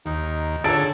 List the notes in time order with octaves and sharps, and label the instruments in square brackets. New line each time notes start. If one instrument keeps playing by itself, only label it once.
[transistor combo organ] D#2 [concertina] D#4
[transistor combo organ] D3 G#4 [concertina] A4 [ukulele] C#5 A5 [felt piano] A6 D7